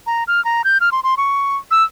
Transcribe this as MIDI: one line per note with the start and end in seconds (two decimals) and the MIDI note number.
0.07 0.24 82
0.28 0.43 89
0.45 0.62 82
0.64 0.78 91
0.81 0.90 89
0.92 1.00 84
1.04 1.14 84
1.17 1.57 85
1.71 1.83 88